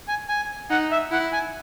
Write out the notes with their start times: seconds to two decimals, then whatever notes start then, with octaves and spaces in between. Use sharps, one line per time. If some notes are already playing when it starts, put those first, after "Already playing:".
0.08 G#5
0.29 G#5
0.70 D#4 F#5
0.91 E5
1.12 E4 F#5
1.33 G#5